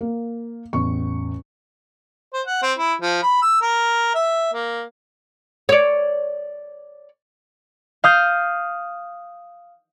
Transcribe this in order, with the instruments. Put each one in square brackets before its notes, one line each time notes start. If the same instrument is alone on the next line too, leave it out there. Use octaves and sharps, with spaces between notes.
[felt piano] A#3
A1 E2 C#6
[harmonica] C5
F#5
C4
E4
F3
B5
E6
A#4
E5
A#3
[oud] C#5 D5
[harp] F5 D#6 G6